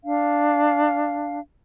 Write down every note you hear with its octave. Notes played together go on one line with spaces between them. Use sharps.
D4 F5